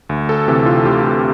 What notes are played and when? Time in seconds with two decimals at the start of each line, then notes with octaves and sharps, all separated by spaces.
0.09 D2
0.29 A4
0.48 C3 E3 G4
0.66 F4
0.85 D2 G4
1.03 F4